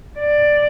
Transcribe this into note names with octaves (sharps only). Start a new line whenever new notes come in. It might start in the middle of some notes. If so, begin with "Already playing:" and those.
D5